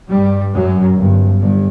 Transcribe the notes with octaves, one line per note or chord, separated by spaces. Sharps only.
G2 G3
F#2 F#3
G1 G2
G1 G2